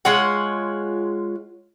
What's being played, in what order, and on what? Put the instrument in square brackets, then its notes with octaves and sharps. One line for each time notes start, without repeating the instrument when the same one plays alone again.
[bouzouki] G#3 F4 C#5 F#5